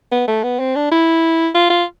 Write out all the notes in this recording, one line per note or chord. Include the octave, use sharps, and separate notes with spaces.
B3
A3
B3
C4
D4
E4
F4
F4